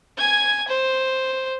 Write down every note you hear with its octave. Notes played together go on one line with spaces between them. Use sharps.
G#5 G#6
C5